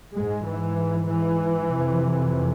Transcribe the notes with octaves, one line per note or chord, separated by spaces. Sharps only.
G#2 G#3
G#2 E3
E3
F2 C3